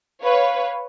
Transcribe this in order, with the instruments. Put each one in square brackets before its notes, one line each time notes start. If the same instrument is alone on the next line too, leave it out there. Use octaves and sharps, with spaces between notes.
[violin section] B4 C#5 [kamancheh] F5